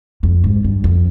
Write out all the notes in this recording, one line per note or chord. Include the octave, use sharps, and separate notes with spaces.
F2
G#2
G2
F2